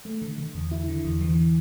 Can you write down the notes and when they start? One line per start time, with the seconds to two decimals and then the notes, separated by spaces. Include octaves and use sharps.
0.05 A3
0.22 D3
0.38 D3
0.55 E2
0.71 E4
0.88 D3
1.04 E2
1.21 E3